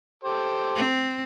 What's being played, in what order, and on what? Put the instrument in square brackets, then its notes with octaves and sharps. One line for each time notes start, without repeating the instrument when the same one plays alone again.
[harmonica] G4 A4 C5
[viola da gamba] C4